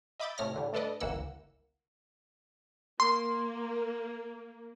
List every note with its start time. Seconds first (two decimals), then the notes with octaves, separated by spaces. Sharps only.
0.20 D#5 E5 B5 D6 G6 A6
0.38 A2 C3 A3 C#5 F6 A#6
0.54 A2 D3 G3
0.73 A3 D4 A4 B4 D5 D#5
1.00 G1 C#2 E3 A#3 F#5 E6
3.00 A#3 C6